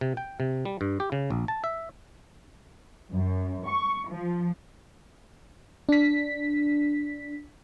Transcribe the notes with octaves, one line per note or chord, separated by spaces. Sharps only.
C3
G5
C3
G3
G2
G4
C#3
A#1
A5
E5
F#2
C#6
F3
D4 B6